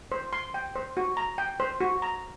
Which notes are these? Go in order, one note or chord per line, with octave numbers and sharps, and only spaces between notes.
C5
C6
G5
C5
F#4
A#5
G5
C5
F#4
A#5